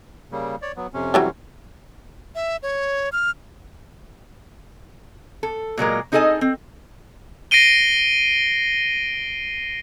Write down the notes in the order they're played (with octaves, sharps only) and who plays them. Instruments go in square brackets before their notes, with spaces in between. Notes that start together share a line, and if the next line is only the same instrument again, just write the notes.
[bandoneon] C#3 G3 A#3
C#5 D5
F#3 B3
F2 C3 C#4
[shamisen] E3 F#3 G3
[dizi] E5
C#5
F6
[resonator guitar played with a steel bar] A4
A#2 F#3 G#3 A#4
C4 D#4 G#4 A4 D#5 G#5
C4
[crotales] A#6 C7 D7 D#7 G7